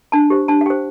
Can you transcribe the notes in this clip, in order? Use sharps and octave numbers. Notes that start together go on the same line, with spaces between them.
D4 A5
G4 C5
D4 A5
F5
G4 C5 G5